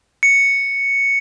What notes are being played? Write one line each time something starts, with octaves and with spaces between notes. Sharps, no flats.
C#7